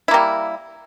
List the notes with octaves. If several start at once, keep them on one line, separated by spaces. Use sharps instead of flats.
G3 A#3 E4